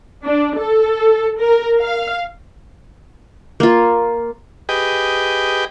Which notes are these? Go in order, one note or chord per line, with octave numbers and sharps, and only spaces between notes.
D4
A4
A#4
F5
A#3 F4
G4 G#4 B4 D#5 G5